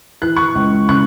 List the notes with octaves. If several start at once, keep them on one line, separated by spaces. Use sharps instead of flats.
E3 F#6
C#6 F#6
C#2
C#3 C#6 F#6